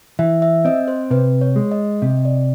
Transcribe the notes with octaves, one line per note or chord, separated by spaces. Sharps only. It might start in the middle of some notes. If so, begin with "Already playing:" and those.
E3 E5
E5
C4 D#5
C5
C3 B4
C#5
G#3
D#5
C3 D#5
D5